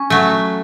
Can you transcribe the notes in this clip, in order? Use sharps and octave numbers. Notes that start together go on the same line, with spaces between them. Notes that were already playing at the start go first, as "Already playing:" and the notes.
Already playing: C#4
F#3 A3